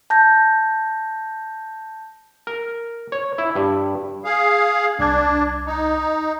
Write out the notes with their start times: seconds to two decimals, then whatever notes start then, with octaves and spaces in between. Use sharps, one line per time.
0.10 A5 G6 A#6
2.47 A#4
3.12 C#5
3.38 E4
3.55 G2
4.25 G#4 F5
4.99 C2 D4 G#6
5.67 D#4